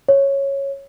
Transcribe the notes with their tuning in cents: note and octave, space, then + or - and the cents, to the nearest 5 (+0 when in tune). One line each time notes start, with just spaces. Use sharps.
C#5 -10